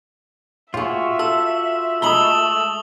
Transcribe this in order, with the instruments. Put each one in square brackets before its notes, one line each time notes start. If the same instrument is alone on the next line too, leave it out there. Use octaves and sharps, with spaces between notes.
[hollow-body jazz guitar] A2 G#4 [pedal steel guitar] F4 F#4 [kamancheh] E5
[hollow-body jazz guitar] A4 [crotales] E6
[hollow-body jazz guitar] G#3 A#5 B5 [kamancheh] A3 E6 [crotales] D#6 F#7 G7